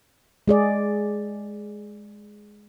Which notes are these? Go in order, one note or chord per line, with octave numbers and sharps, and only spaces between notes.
G#3 G#4 D5